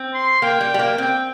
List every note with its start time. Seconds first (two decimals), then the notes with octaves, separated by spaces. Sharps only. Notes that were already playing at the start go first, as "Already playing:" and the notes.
Already playing: C4
0.14 C6
0.42 A#3 G5
0.61 G3
0.74 G3
0.79 A#3
0.98 C4 G5